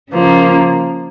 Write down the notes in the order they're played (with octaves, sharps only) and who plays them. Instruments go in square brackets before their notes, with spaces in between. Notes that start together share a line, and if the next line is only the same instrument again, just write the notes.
[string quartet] C#3 F3 A#3